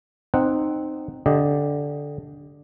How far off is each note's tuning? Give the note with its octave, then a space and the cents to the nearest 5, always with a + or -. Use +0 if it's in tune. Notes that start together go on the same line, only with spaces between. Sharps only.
C4 +0 D#4 -15 F#5 +0
D3 -15 G4 +0 D#5 +0